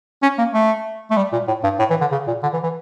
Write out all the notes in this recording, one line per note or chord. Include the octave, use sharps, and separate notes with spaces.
C#4
A#3
A3
A3
G3
A#2
A2
G2
A2
E3
D3
C#3
A#2
D3
E3
E3